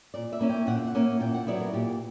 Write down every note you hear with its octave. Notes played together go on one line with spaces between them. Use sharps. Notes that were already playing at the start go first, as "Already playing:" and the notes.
A#2 D5
E5
A#3 C#4 E4
G5
A#2 F#5
E5
F#5
A#3 C#4 E4
A#2 G5
F#5
F#3 B3 E4 D5
A#4
A#2 G4